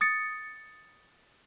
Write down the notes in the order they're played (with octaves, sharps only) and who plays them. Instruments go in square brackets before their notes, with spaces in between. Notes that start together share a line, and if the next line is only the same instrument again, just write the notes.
[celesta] D#6 A6 C#7